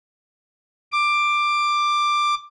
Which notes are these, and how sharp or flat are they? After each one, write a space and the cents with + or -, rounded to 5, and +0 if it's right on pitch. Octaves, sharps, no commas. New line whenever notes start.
D6 +10